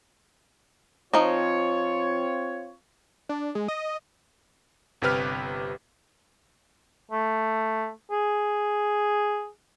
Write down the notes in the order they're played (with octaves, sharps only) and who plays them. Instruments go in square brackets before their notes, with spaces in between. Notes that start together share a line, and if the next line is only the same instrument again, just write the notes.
[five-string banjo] F3 D#4 [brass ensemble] C4 F4 C#5
[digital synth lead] D4
G#3
D#5
[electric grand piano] G1 C3 G4 B4 F6
[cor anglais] A3
G#4